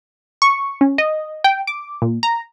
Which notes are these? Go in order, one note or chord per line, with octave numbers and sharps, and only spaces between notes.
C#6
C#4
D#5
G5
D6
A#2
A#5